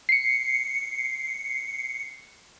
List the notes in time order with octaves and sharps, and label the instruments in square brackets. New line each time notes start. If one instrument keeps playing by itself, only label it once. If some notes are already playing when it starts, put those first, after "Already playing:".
[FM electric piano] C7 C#7